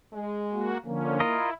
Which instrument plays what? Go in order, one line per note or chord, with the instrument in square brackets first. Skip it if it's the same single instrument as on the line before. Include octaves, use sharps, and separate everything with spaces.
[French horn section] G#3
[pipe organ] A#3 F#4
[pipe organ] D3 F3 C#4 [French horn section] A#3
[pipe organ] E4 [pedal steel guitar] F4 A#4 D#5